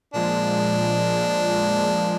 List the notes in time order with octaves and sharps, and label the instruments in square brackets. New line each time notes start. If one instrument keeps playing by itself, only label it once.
[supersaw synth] A#2 F3 G#3 [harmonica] D4